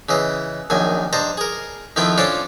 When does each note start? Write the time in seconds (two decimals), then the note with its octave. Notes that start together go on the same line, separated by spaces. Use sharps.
0.09 C#3 E3 D#5
0.70 A#1 F#2 D#3 G#5
1.13 G2 C5 D#5 A5 A#5
1.37 G#4 A#4
1.96 F2 D#3 F3 E4 F4 G5
2.18 C#4 D4 F4 A4 C5 G5